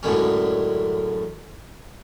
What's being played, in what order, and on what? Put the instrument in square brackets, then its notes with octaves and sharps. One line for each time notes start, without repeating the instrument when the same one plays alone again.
[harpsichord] F#2 A2 D3 G#3 C#4